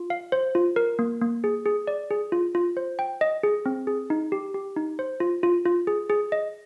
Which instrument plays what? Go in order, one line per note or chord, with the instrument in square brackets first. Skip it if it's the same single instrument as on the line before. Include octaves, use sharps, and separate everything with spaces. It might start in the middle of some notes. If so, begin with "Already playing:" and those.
Already playing: [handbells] F4
F5
C5
F4
A#4
A#3
A#3
G#4
G#4
D5
G#4
F4
F4
C5
G5
D#5
G#4
C4
G#4
D#4
G4
G4
D#4
C5
F4
F4
F4
G#4
G#4
D#5